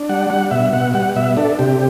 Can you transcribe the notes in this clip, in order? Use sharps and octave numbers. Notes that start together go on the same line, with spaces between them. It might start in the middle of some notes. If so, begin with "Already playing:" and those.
Already playing: D4
G3 F#5
G3 F#5
B2 E5
B2 F#5
G3 F#5
B2 E5
D4 A4
C3 G4